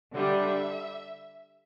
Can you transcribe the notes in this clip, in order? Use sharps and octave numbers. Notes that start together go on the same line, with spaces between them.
D3 G3 D4 E5